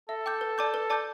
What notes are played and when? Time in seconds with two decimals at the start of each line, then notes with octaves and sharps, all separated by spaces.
0.09 A4 E5
0.26 G5 D6 G6
0.41 B4
0.58 D5 A5 D6 G6
0.74 B4
0.90 D5 A5 D6 G6